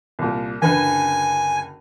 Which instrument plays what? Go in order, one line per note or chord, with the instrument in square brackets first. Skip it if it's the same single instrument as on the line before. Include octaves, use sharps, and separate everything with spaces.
[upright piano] C2 A#2
[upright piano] F#1 D2 B4 [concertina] G#5